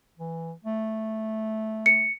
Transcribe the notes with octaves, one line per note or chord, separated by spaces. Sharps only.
E3
A3
C#7